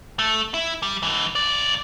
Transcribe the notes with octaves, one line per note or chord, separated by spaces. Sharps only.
A3
E4
G3
G#2 E3
B1 D5